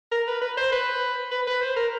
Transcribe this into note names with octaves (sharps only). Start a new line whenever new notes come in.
A#4
B4
B4
C5
B4
B4
B4
C5
A#4